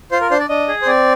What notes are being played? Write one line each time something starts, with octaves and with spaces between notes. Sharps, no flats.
F4 C5
A#4
D4 C5
D5
D4 D#5
G#4
C5
C4 D5